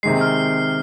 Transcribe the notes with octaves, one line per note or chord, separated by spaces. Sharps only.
C3 D#3 G#3 C7
F6